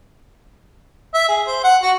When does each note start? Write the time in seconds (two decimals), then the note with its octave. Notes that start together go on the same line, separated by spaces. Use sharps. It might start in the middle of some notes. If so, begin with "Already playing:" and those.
1.14 E5
1.28 G#4
1.47 C5
1.64 F#5
1.82 F#4